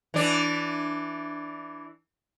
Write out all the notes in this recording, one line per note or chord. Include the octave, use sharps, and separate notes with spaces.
E3 D4